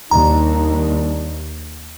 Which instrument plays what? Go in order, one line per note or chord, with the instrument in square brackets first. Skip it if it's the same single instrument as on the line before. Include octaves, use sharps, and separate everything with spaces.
[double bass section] D#2 [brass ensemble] G3 D4 D#4 [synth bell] A#5